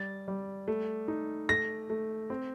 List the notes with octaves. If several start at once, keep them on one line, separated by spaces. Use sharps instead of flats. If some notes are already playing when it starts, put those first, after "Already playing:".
Already playing: G3 A6
G3
A3
D#4
A3 A#6
A3
C4